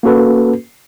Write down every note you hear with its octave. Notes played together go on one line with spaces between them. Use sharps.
A#3 C#4 F#4 A4 B4